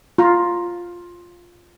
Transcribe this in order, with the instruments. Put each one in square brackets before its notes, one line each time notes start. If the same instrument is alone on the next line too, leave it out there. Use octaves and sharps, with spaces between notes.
[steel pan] F4 A#5